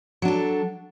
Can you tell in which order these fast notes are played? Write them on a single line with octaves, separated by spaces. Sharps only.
F#3 D4 A4